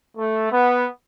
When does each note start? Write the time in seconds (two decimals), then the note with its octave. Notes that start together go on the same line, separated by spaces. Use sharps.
0.17 A3
0.50 B3